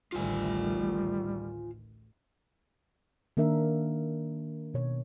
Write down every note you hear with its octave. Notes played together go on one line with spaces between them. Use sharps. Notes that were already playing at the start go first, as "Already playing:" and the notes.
A1 D2 D#3 G3 F4 C5 G#5
D#3 A#3 D4 A#4 E5
B2 C#5